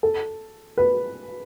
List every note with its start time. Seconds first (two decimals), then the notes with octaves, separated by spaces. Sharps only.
0.03 A4
0.78 B4